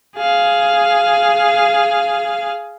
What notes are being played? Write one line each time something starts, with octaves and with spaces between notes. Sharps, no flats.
G#4 F5